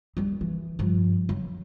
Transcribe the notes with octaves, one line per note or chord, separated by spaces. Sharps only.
G3 C4
E3
G2 F3
F#3